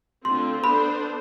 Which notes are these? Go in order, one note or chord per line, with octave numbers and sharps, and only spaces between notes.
D3 A3 C4 F4 C6
B3 D4 A4 C5 B5